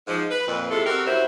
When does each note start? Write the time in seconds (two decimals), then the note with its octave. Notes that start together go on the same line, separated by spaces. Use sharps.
0.08 G#2 F3
0.30 B4
0.47 F2 A#2 B4
0.71 C3 G#3 E4 F4 A4
0.86 C4 F#4 G4 A4 A#4
1.06 F#2 F#3 G3 E4 C5 E5